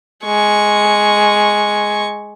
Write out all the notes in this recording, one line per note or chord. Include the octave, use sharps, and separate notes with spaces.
G#3 C#6